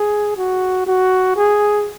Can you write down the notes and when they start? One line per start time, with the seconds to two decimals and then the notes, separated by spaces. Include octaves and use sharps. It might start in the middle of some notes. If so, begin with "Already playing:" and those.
Already playing: G#4
0.37 F#4
0.87 F#4
1.36 G#4